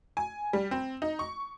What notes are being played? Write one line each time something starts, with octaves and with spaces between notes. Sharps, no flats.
G#5
G3
C4
D#4
C#6